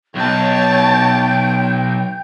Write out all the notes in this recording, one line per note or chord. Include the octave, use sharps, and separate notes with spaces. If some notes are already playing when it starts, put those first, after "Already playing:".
B1 C#5 G5 A5 G6